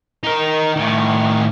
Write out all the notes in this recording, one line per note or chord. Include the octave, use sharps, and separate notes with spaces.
D#4 A#4
A2 D#3